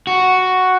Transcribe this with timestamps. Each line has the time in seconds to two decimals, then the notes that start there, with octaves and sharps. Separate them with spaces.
0.07 F#4